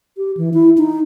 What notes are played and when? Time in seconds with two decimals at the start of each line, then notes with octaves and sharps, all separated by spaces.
0.17 G4
0.37 E3
0.54 E4
0.78 D#4